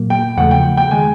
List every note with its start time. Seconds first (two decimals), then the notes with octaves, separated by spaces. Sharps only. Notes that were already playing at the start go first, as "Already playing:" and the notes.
Already playing: A#2 F#3 A#3
0.10 G5
0.37 E2 C#3 F3 A3 F#5
0.51 G5
0.77 G5
0.91 D#3 G#3 G#5